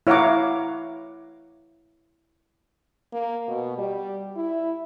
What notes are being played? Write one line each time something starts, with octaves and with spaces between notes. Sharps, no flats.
E4 C#5 F5 F#5 A#5 D6
A#3
B2
G3
E4